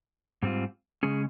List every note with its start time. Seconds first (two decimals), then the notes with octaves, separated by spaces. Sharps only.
0.43 G#2 G3 C4 F4
1.03 C#3 G#3 C#4 G#4